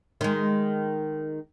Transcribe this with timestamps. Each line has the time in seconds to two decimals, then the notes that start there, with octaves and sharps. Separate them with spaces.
0.21 D#3 G#3